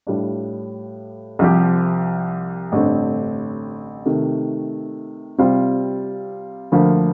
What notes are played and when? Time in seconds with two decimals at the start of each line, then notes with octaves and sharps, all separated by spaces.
0.07 A2 G3 D4 F4
1.39 C2 C3 F3 C4 G4
2.72 A1 G2 D3 A3 C4
4.06 C3 D#3 A3
5.38 C3 G3 C4 F4
6.72 D2 D3 F3 A#3 F4